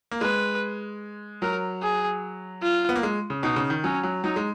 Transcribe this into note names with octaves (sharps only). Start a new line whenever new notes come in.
A#3
G#3 B4
F#3 A#4
G#4
F4
B3
A#3
G#3
C#3
B2 D#4
C#3
D#3
F#3 C#4
F#3
F#3 D#4
G#3